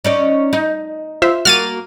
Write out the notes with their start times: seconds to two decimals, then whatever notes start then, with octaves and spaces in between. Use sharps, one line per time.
0.05 C#4 D#4 D5
0.53 D#4
1.22 F4 C5 E5
1.45 A#3 F#4 F6 A6 D#7